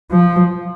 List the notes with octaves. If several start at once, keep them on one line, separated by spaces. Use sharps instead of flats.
F3